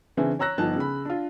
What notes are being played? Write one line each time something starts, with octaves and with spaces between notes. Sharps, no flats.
C#3 E3 C4 D4 E4
C#5 A#5 E6 F#6 A#6
G1 F3 D#4 A5 F#6
C#3 B5
D4 F4